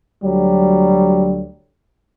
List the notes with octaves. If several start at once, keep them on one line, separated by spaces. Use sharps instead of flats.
D2 F#3 G3